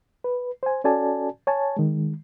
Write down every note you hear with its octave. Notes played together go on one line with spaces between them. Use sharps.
B4
C5 G#5
C#4 F#4 A4 D5 G#5 A5
C#5 G#5 A5
D#3 G#3